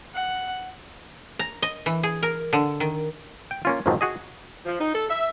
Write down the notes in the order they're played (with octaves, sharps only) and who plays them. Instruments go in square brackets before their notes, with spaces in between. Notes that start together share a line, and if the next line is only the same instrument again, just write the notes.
[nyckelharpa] F#5
[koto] A#5
D#5
E3
G#4
A#4
D3
D#3
[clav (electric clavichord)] G5
A#3 C#4 F4
F2 G#2 B2 D#3 F3 F#3
F#4 G#4 D#5
[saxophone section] F3
D#4
A4
E5